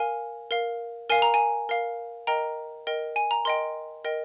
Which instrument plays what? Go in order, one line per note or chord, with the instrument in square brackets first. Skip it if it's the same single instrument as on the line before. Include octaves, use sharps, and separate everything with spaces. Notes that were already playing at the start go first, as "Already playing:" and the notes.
Already playing: [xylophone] A#4 F5 G#5
A#4 F5
A#4 F5 G#5
A#5
G#5
A#4 F5
A#4 D#5 G5 A#5
A#4 D#5 G5
G#5
A#5
A#4 D#5 G5 C6
A#4 D#5 G5